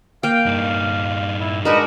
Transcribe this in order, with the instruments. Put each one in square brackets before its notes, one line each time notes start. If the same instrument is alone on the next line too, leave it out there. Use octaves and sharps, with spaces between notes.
[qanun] A#3 G5 [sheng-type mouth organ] F5
[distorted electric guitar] G2 D#4
[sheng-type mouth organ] E4
[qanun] G#3 D4 A#4 [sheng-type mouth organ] D#4 B4 D#5 [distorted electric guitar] F#4